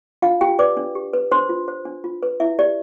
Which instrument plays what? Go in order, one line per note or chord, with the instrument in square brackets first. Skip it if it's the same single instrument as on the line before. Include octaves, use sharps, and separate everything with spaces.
[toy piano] D4 F4 F5
F4 G4 G5
B4 D5 D6
D4
G4
B4
D4 C5 C6
F4
C5
D4
F4
B4
E4 E5
G4 D5